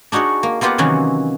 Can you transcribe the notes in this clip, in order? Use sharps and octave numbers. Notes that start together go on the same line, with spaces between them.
D4 D#4 F#4 G#4 C#5
A#3
A#3 B3 F4 G4 F5 F#5
C3 D#3 E3 F#3 C#4